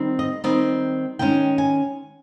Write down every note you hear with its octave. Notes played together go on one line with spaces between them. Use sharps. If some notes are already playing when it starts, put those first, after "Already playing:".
Already playing: D#3 G3 C4
D#5
D#3 G3 C4 D#5
D#3 G#3 C#4 G5
G#5